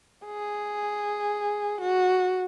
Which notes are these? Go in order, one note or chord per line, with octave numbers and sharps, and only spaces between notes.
G#4
F#4